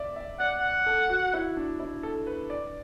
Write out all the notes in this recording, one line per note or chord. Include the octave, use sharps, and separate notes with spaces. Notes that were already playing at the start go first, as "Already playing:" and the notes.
Already playing: D5 E5
E5
D5 F#5
F#5
A4
F#4
E4
D4
E4
A4
B4
D5